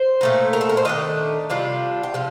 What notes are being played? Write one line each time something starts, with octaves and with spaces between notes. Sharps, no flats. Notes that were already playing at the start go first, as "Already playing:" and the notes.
Already playing: C5
A#2 A3 D#4
A#4
A4
A#4
C5
D#3 A3 D4 D#5
C3 G3 D4 F4
G5
C3 F3 F5